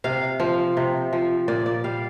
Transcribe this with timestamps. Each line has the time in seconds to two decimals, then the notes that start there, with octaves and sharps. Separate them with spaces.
0.04 C3 F5
0.40 F3
0.77 C3
1.13 F3
1.48 A#2 D5
1.66 D5
1.84 G3 F5